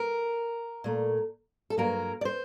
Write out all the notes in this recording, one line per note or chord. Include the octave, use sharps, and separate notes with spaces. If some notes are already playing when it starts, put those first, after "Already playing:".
Already playing: A#4
A#2 A3
A4
G2 F#3 A#3 A#4
D5
C5